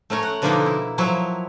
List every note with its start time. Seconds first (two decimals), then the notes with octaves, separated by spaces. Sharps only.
0.10 A3 C#4 A#4 C#5
0.23 F#5
0.42 B2 D3 F3 A#3 D#4 A#4
0.66 E4
0.98 F3 F#3 E4 C#5